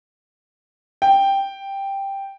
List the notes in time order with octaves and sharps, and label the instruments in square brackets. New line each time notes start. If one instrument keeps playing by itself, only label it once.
[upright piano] G5